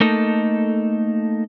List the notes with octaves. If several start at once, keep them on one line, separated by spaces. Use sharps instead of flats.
A3 A#3 D#4 A4 D#5